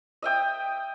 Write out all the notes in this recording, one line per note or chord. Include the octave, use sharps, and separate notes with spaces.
D#5 E5 G5 D#6